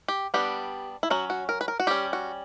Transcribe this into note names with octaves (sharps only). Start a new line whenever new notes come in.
G4
G3 B3 D4 G4
E4
F#3 C#4 F#4
F#4
A#4
B4
A#4
F#4
G3 C#4 G4
F#4